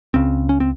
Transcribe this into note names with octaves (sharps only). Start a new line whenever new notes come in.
C#2 C#3 C4
C#4
C4